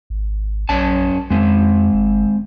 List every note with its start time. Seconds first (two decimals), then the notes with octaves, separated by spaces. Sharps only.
0.10 G#1
0.69 A#1 F#2 C#4 A5
1.30 F2 G#3 C4
1.93 G1